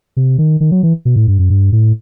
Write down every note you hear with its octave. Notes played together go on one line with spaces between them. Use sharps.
C3
D#3
D#3
F#3
E3
B2
A2
G2
F#2
G2
A2